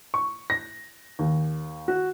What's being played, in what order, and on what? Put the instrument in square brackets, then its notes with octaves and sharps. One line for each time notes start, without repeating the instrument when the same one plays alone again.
[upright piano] C#6
A#6
D#2
F#4